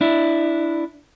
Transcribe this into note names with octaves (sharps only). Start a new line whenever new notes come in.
D4 E4